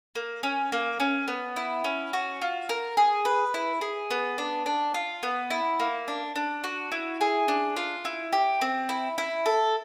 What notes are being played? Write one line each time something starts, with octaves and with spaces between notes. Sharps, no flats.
A#3
C#4
A#3
C#4
B3
E4
C#4
F#4
F4
A#4
G#4
B4
E4
G#4
B3
D4
D4
F4
B3
E4
A#3
D4
D4
F#4
E4
G#4
D4
F4
E4
G4
C4
E4
E4
A4